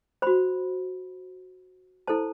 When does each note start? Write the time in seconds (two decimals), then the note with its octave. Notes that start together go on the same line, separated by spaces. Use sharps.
0.22 F#4 C5 B5
2.07 E4 A4 C5 A5